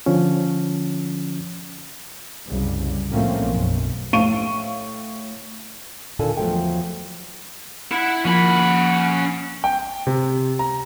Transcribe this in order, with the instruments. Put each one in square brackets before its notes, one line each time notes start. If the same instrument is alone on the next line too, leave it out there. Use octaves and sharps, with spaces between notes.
[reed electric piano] D3 F3 C#4
[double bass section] C2 F#2 C#3 G3
A2 F3 A3 A#3 C4 C#4
B1 F#2
[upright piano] A2 F5 C#6 D#7 G7
[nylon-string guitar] D#2 A#2 D3 A#3 A4 G#5
E2 F3 F#3 A3 G5
[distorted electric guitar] E4 [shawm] F#5
[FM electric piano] F3 A#3 [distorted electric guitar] C#4 B5 [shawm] F#5
[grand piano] G5
C3
A#5